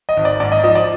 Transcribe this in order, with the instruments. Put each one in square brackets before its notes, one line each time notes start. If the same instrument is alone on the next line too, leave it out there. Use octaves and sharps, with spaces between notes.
[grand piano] D#5
G#1
D5
G#2 D5
D#5
F3 D#5
D5